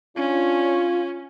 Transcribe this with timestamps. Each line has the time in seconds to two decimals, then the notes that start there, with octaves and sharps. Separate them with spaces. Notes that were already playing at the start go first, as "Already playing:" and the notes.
0.17 C#4 D4 F4 C#5